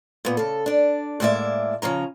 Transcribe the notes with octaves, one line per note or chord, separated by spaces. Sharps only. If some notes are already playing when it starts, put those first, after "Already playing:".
A#2 B3
C#3 A4
D4 D5
A2 G#3 A#3 C#4 D5 E5
C#3 F3 C#4 A#5